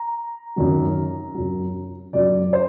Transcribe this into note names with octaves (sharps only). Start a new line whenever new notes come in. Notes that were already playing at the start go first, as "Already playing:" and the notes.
Already playing: A#5
F#2 D#3 F#3
F#2 F#3
F#2 F#3 D5
C5